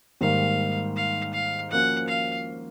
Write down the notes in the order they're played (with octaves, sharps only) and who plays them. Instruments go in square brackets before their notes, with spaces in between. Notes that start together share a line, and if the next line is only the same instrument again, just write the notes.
[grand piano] G#2 D#3 G3 A#3 [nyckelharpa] F5
[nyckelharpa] F5
F5
[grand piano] F3 A#3 C#4 F#4 [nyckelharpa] F#5
[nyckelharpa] F5